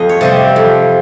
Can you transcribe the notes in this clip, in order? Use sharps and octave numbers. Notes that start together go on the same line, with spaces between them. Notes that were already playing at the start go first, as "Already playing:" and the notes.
Already playing: F2 D#5
C#5
C3 G3 C4
F2